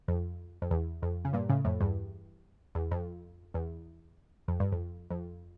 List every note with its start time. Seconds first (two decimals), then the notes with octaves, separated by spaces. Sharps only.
0.08 F2
0.62 F2
0.71 E2
1.02 F2
1.25 C#3
1.33 G2 A#2
1.49 A2 C#3
1.64 F2 A2
1.80 E2 G2
2.75 E2
2.91 F2
3.54 E2
4.48 F2
4.60 G2
4.72 F2
5.10 F2